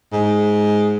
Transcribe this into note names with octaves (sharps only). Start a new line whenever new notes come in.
G#2